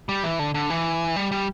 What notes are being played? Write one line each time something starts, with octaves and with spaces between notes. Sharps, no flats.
G3
E3
D3
D3
E3
G3
G3